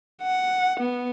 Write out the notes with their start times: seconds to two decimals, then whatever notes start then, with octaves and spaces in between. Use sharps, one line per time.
0.22 F#5
0.79 B3